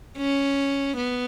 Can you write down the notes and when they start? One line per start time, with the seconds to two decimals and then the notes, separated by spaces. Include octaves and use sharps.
0.17 C#4
0.97 B3